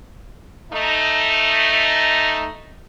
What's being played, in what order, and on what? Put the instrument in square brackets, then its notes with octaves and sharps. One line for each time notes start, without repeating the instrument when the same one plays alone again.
[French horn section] A3 D#4